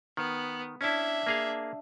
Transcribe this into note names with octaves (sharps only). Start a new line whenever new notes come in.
D#3 B3
C#4 D4 E4 E5
A#3 G#4 F5